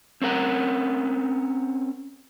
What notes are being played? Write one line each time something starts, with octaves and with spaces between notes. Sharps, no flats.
C4 C#4 A#4 F#5